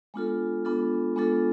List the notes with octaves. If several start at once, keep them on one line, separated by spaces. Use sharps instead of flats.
G#3 B3 D4 F4 A4
G#3 B3 D4 F4 A4
G#3 B3 D4 F4 A4